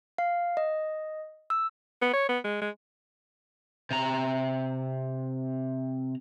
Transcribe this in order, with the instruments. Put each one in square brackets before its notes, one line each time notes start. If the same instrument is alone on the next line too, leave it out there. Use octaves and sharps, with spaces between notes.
[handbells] F5
D#5
E6
[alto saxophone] B3
C#5
B3
G#3
G#3
[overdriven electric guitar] C3 A#5